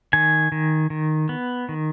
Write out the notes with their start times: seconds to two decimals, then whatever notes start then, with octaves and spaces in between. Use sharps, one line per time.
0.13 D#3 G#5
0.52 D#3
0.90 D#3
1.29 B3
1.69 D#3